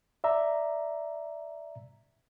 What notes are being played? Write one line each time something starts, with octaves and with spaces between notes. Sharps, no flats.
D5 E5 A#5